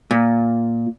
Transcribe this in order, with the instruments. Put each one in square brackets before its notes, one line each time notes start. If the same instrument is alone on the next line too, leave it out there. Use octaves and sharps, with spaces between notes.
[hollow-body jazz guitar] A#2